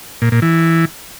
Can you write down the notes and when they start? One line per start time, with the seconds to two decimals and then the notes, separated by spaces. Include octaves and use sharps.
0.22 A#2
0.32 A#2
0.42 E3